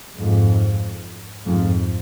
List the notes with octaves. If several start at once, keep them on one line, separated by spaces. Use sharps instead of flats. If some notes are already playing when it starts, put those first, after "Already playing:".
F2 G#2
F2 G#2